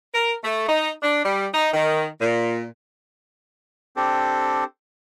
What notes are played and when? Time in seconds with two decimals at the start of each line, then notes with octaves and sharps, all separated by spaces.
0.14 A#4
0.44 A3
0.67 D#4
1.02 D4
1.25 G3
1.53 D#4
1.73 D#3
2.21 A#2
3.97 C4 D4 G4 A4